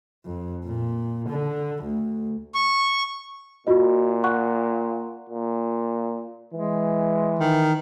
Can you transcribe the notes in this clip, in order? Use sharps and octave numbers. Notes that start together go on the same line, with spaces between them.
F2
A#2
D3
D2
C#6
A#2 F4 F#4 D#5
F#5 C#6 F#6
A#2
E3 G#3
D#3